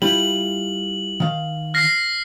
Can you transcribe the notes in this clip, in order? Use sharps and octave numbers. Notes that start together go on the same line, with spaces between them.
G3 E4 F4 F#7
D#3 F5
F6 A#6 C7